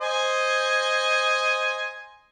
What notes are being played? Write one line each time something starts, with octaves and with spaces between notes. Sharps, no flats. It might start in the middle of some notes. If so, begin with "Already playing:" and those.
C5 D#5 G#5